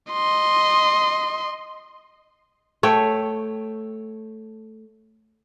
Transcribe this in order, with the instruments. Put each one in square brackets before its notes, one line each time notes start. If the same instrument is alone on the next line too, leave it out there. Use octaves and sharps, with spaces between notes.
[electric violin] D#5 C6
[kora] A3 C#5 G5